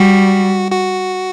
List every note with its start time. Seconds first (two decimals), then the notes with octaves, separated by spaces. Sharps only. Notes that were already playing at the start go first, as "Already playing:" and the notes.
Already playing: G3 F#4
0.72 F#4